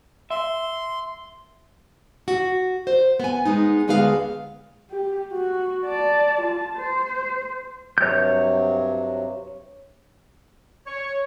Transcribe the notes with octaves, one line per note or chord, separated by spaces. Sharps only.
E5 C6
F#4
C5
B3 G#5
G#3 B3 D#4
D2 G#3 B3 G#4 B4 F5
G4
F#4
D5 A5
F4 A5
C5
G2 C3 F#3 C#5 G6
C#5